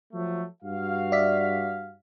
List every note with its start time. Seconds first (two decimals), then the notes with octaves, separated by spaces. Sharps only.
0.13 F3 F#3 A3
0.63 G2 F#4 F5
1.12 D5 E5 B6